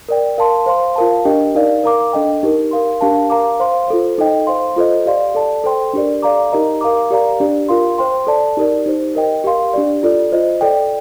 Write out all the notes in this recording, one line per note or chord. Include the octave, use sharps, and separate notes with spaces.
A#4 D5 G5
A#4 F5 A5 C6
C5 F5 C6
F4 A#4 F5 A5
D4 G4 A#4 D#5 G5
D#4 A#4 D5 F5
A#4 F5 A#5 D6
D4 A4 D#5 G5
D#4 G4 A#4
A#4 F5 C6
D4 G4 A#4 F5 A5
A#4 F5 A#5 D6
C5 F5 C6
F4 A4 C5
D#4 A4 D#5 G5
C5 F5 C6
F4 A4 C5 D#5
G4 D5 F5 C6
A4 D5 A5
A4 C5 G5 C6
D4 G4 A#4 D5
A4 D5 F5 A#5 D6
D#4 G4 A#4 D#5 A#5
A#4 F5 A#5 D6
G4 A#4 D5 F5 A#5
D4 G4 D5
F4 A#4 F5 C6
C5 G5 C6
A4 D5 A5
D#4 G4 A#4 D5
D#4 G4 C5
A#4 D#5 G5
G4 A#4 F5 C6
D4 G4 D5
F4 A4 D5
F4 C5 D#5
A4 D5 G5